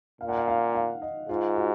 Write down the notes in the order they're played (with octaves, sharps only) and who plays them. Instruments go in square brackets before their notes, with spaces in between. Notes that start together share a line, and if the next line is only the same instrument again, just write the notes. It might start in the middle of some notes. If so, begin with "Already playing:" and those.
[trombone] A#2 [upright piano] F5
[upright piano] F#5
F5
F5
F5
D#5
[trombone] G#2 [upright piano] F4
[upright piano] F#4